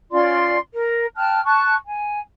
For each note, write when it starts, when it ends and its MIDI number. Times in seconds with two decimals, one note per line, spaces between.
0.12 0.57 61
0.12 0.57 65
0.12 0.57 74
0.12 0.57 84
0.73 1.06 70
1.16 1.40 79
1.16 1.40 81
1.16 1.40 89
1.16 1.40 90
1.45 1.74 81
1.45 1.74 85
1.45 1.74 90
1.85 2.19 80